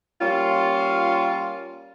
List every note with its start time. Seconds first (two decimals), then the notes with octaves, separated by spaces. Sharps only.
0.21 G3 A#3 C#4 F4